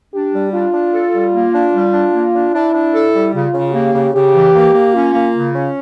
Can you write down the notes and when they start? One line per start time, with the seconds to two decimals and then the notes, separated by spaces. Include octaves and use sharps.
0.14 D4 G4
0.34 G3
0.53 D4 F4
0.73 D4
0.93 A4
1.13 G3
1.33 A#3
1.53 D4
1.73 G3
1.93 D4
2.13 A#3
2.34 D4
2.54 D4 E4
2.74 D4
2.94 A4
3.14 G3
3.34 C#3 F4
3.53 C#3
3.74 A#3 G4
3.94 C#3
4.14 C#3 G4
4.34 E3
4.54 A#3
4.74 A#3
4.94 C#4 F4
5.14 A#3
5.35 C#3
5.55 C#4